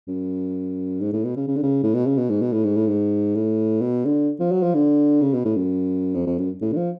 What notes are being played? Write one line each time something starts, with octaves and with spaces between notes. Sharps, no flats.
F#2
G#2
A2
B2
C#3
C#3
D3
C#3
A2
B2
C#3
B2
G#2
B2
A2
G#2
A2
G#2
A2
B2
D3
F3
F#3
F3
D3
C#3
B2
A2
F#2
F2
F2
F#2
A2
D3
F3